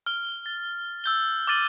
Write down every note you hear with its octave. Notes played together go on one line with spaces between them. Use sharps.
F6 G7
A6
E6 G6 G7
D6 F6 A6 D#7 F#7